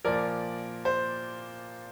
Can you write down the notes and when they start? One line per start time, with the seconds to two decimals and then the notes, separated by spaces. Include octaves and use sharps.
0.05 A#2 F3 A#4 D5
0.85 C5